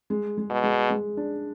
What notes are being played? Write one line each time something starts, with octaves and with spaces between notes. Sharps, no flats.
G#3
G#3
B2
G#3
G#3
D4